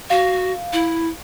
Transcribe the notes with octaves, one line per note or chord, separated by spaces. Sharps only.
F#4 F5
E4